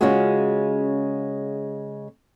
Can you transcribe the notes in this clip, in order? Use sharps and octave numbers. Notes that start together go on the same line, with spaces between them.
C#3 G#3 C#4 F4 F#4 G#4